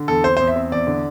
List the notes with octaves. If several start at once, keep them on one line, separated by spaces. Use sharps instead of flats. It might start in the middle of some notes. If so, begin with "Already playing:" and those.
Already playing: D3
E2 A4
C4 C5
E2 C5
E5
C4
E2 D5
D3